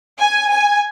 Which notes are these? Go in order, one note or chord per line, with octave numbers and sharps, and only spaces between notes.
G#5
G#5